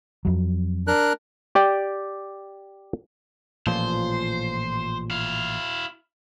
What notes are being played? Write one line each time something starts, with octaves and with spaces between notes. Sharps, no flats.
F2 F#3
D4 A#4 F#6
G4 D5 G5
A1 A#2 F3 C5
E4 F5